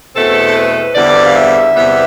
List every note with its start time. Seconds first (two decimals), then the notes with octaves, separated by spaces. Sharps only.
0.15 E2 B2 A3 C4 A4
0.47 C5
0.55 B4
0.95 E2 D3 G3 C4 D5
1.24 F5
1.35 E5
1.75 E2 C3 G3 B3